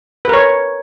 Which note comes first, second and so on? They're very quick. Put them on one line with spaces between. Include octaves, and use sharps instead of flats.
B4 A#4 C#5